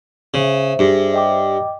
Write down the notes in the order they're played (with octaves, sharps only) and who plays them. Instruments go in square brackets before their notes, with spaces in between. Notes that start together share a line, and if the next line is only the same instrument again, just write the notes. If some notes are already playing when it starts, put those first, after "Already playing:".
[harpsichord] C#3 [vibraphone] C5 E5
[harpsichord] G2 [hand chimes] G#4 D6
[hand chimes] D#5 G5 D6